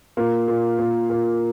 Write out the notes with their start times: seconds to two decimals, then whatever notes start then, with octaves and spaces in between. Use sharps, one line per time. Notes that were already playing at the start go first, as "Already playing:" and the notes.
0.17 A#2 A#3
0.48 A#2
0.79 A#2
1.10 A#2